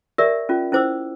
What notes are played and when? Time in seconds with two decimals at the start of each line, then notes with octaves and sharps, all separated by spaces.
0.18 G4 A#4 D5 E5
0.49 C#4 F4
0.72 C#4 E4 C5 D6 E6